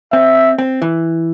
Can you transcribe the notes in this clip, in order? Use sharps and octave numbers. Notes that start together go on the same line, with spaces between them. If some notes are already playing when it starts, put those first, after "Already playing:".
C4 E5
C4
E3